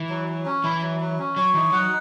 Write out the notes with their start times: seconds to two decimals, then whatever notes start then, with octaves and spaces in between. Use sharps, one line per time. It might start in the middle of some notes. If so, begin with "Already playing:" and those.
Already playing: E3
0.09 F#3
0.28 F#3
0.46 C#4
0.64 E3 E4
0.82 F#3
1.00 F#3
1.19 C#4
1.36 F#3 C#5
1.54 E3 D#4
1.72 F#3 F#5